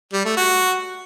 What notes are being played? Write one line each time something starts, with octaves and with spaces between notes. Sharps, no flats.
G3
A3
F#4